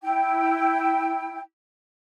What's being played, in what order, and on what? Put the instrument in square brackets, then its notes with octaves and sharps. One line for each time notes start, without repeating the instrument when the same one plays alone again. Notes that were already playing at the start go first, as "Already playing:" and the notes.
[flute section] E4 G5